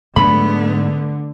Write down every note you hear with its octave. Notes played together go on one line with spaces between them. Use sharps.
G#2 D3 F#3 G#3 A3 B3 B5